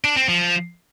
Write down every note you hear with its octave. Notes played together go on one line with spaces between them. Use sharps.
D4
C4
F3